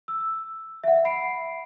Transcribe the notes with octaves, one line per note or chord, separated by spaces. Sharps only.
E6
E5 F#5
B5 C7 D7